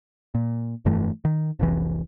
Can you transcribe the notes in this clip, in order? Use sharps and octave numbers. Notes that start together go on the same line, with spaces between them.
A#2
F1 G2 E3 A3
D#3
F1 C2 E3